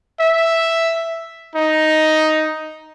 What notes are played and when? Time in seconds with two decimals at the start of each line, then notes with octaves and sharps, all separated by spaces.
0.20 E5
1.56 D#4